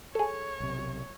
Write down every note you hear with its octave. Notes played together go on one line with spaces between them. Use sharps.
G#4 A4 C#5
B1 C3